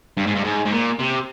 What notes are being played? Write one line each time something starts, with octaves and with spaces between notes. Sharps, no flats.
G2
G#2
G2
G#2
G#2
A#2
C3